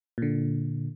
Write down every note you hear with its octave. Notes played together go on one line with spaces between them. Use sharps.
A#2 D3